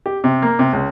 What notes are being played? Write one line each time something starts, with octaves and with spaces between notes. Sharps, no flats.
G4
C3
A#3
C3
C#2